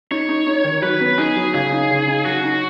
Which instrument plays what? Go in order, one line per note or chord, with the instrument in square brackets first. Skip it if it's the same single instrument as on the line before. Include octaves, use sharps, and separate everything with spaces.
[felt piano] D#4 [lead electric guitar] C#5
[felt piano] D#4
D#4
D#3
[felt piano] F#3 [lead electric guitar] B4
[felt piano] B3
[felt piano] D#4 [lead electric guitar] G#4
[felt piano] F#3
[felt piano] C#3 [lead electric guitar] G#4
[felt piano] D#4
C#3
D#4
[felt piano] F#3 [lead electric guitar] F#4
[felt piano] D#4